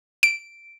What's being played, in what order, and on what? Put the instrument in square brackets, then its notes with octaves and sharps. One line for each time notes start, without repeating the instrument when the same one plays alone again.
[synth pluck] D7